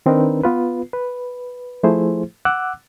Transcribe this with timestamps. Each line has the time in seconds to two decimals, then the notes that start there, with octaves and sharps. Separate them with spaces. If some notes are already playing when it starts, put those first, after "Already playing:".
0.06 D#3 C4 D4 D#4 A#4 B4
0.43 B3 F4 B4
0.93 B4
1.83 F3 A3 E4 G#4 C5
2.45 F#5 D6 E6 F#6